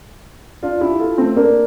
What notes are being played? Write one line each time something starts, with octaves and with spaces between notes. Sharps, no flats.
D4 F4
E4 G4
F4 A4
A3 C4
A#3 D4